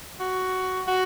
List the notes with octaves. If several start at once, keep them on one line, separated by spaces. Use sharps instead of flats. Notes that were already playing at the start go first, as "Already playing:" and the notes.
F#4
F#4